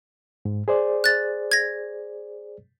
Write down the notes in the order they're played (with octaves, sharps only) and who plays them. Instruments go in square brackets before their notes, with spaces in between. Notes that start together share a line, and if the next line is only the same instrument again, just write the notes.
[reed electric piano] G#2
G#4 C5 D5
[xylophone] F#6 A6
G#6 A#6